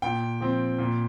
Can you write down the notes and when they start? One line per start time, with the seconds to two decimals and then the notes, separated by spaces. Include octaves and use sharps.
0.02 A#2 G5
0.41 F3 C4
0.79 A#2